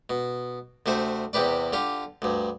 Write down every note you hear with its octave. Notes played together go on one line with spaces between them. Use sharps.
B2
D2 C3 A3 C5
E2 C3 G4 B4 D5
D3 F4 G4
D2 G2